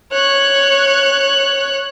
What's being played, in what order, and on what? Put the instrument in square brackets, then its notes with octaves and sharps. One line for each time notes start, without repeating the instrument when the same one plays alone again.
[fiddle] C#5 F#6